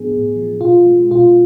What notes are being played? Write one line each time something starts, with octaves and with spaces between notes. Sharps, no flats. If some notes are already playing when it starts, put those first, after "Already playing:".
Already playing: A2 F3 B3 D4 G#4
A2
F3
B2 F4
G#3
B2 F4